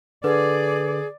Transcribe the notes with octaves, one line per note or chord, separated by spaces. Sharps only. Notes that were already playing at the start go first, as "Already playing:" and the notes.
D3 G#4 B4 D5 D6